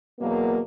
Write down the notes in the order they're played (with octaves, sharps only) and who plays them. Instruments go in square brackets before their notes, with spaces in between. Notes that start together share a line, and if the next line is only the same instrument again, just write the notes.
[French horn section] E2 B2 F#3 A#3